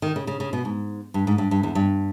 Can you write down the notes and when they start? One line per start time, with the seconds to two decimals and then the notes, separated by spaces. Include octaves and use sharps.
0.02 D#3
0.16 C#3
0.27 C#3
0.40 C#3
0.53 B2
0.65 G#2
1.14 G2
1.27 G#2
1.38 G2
1.51 G2
1.63 E2
1.75 G2